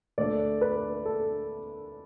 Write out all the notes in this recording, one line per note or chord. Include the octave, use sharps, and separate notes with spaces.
D2 D3 A3 D4 D5
B4
A4